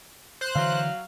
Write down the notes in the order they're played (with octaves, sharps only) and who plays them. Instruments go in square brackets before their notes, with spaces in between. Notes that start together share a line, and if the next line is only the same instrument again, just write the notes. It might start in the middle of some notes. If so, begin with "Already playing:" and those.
[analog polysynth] C5 F#6
[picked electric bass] D3 E3 [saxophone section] F#3 F5